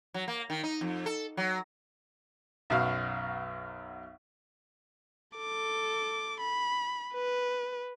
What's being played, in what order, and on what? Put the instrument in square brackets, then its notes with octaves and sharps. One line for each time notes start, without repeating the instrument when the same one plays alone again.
[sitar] F#3
A#3
D#3
D#4
F2
A4
F#3
[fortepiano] B1 F#2 B2 F5
[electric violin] A4 D6
B5
B4